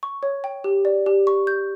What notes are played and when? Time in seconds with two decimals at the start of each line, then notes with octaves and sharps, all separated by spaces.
0.03 C#6
0.23 C#5
0.44 G5
0.64 G4
0.85 D5
1.06 G4
1.27 C#6
1.47 G6